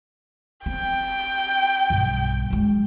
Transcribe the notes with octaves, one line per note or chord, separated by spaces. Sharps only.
C4 G5
B1 G2
F#2 G#3